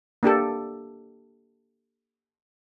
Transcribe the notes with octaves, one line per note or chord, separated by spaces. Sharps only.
A#3 D4 G4 A4